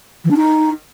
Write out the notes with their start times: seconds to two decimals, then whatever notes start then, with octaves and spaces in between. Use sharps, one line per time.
0.25 E3
0.30 D4
0.36 D#4